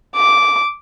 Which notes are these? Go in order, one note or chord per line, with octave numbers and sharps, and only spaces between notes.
D6